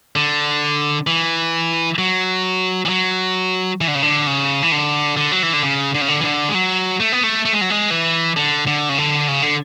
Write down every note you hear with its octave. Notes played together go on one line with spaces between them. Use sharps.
D3
E3
F#3
E3
F#3
E3
D3
C#3
D3
C#3
E3
D3
D3
F#3
E3
D3
C#3
D3
C#3
D3
E3
D3
G#3
F#3
A3
B3
A3
A3
G#3
F#3
G#3
E3
D3
D3
C#3
D3
C#3
D3